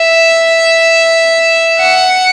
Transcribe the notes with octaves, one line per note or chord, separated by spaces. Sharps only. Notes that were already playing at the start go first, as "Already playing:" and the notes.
Already playing: E5
F#5